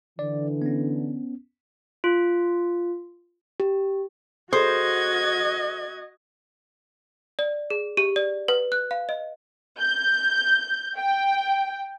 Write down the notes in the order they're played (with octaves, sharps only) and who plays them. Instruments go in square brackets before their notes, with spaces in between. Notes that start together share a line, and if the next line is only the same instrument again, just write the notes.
[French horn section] D3 E3 [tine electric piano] D5
[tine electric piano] B3 C#4
[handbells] F4
[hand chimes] G4
[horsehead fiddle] F#4 D#5 [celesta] G#4 A4 D#6 [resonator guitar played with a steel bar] C5 [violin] G#6
[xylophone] D5
G#4
G4
D5
B4
F#6
F5
D#5
[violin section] G6
G5